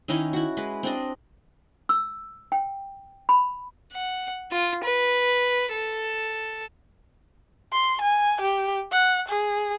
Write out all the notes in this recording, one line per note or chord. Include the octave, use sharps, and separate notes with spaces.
D#3 C#4 D#4 E4
E4 F#4
G#3 B4
C4 D4 D#5
E6
G5
B5
F#5
F4
B4
A4
C6
G#5
G4
F#5
G#4